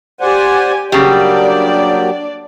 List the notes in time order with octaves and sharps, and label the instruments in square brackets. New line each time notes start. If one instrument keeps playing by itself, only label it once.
[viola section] G4 G#5 [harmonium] C5 D5 F#5
[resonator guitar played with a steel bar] C#3 G3 [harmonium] F#3 A#3 G4 [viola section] D4 D5